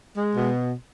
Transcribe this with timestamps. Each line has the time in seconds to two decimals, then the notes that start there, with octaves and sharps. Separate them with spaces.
0.16 G#3
0.35 B2